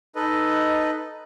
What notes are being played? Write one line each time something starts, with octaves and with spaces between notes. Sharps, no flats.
D#4 A4 B4 D#5